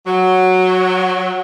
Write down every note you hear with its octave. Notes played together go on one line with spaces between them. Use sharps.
F#3